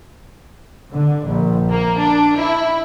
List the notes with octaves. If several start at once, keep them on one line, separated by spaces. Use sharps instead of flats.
D3
A#1
A#3
D4
E4